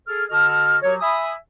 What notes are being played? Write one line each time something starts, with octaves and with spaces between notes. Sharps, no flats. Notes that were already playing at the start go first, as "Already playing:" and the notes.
G#4 A4 F6
D3 F#4 A4 D#5 A5 F6
F#3 F#4 G4 A#4 C#5
E5 G#5 B5 D#6